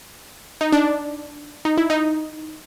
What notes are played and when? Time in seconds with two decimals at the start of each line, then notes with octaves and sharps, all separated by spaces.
0.61 D#4
0.72 D4
1.65 D#4
1.77 E4
1.90 D#4